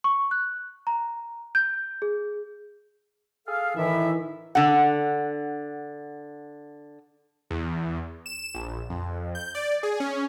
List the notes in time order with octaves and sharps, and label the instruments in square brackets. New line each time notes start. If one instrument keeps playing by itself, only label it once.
[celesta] C#6
F#6
A#5
G6
G#4
[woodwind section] G#4 A4 F5
[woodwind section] A2 E5 [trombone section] D#3 E3
[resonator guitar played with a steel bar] D3 F#5
[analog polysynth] E2
E7
A#1
F2
G6
D5
G#4
C#4